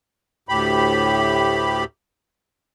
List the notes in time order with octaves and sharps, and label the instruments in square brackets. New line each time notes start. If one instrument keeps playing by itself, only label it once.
[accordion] D2 A2 G4 B5